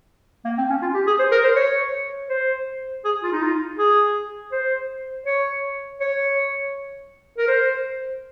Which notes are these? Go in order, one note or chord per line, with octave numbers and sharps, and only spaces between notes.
A#3
C4
C#4
F4
G4
G#4
C5
A#4
C5
C#5
C5
G#4
F4
D#4
F4
G#4
C5
C#5
C#5
A#4
C5